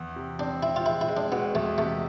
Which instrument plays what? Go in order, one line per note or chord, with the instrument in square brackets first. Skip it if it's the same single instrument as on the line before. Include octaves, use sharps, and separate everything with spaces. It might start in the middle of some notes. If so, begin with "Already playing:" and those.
Already playing: [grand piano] E2
C3
[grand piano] C4 [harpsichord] D4
[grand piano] C4 [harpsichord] E4
[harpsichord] F4
[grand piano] G#3 [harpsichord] E4
[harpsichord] E4
[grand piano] G#3
[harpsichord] D4
[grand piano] B2 [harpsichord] B3
[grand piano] E2 [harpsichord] A3
[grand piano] C3 [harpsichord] A3